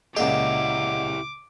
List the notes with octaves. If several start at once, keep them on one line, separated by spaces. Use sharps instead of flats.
C#2 A#2 E4 G4 G#4 D#5 F#5 D6